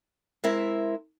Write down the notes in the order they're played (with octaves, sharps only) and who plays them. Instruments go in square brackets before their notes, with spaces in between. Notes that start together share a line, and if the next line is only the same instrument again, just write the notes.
[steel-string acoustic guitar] G#3 C4 E4 A#4 E5